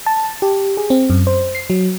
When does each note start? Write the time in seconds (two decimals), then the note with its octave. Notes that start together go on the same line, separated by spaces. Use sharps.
0.06 A5
0.42 G4
0.77 G#4
0.90 C4
1.10 F#2
1.27 C5
1.55 C7
1.70 F#3